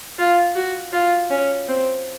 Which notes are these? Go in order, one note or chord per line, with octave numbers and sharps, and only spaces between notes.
F4
F#4
F4
C#4
C4